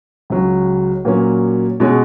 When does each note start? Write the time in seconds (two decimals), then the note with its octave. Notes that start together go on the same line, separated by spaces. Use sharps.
0.30 C#2 C#3 F#3 C#4
1.05 A#2 F#3 A#3 C#4
1.80 B2 G#3 C#4